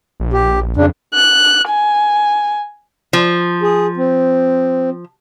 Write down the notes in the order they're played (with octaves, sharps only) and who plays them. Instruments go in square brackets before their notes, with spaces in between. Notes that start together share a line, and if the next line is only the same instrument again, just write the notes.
[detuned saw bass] A#1
[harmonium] G4
[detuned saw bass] F2 [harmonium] C#3 D4
[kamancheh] F#6
G#5
[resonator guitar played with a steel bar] F3
[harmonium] G#4
C4